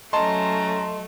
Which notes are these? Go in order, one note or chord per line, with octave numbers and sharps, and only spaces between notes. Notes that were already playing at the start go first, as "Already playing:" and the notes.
F#3 A3 C#4 D#5 A5 A#5 C6